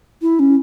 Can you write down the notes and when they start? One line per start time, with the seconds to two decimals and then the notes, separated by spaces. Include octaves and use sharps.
0.22 E4
0.39 C#4